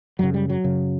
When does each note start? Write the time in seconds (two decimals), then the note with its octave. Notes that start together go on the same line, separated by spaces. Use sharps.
0.19 F#2 C#3 F#3
0.34 G3
0.50 F#3
0.64 F#2 C#3